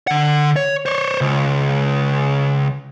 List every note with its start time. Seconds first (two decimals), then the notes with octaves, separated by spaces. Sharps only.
0.07 D3 F#5
0.56 C#5
0.86 C5 C#5
1.21 C#2